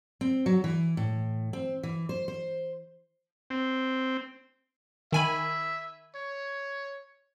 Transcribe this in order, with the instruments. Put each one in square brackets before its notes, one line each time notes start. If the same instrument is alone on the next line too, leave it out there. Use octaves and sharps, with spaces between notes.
[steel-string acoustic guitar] C4
F#3
E3
A2
C4
E3
C5
C5
[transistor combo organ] C4
[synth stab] D#3 G#5 B5 [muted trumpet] E5
[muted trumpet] C#5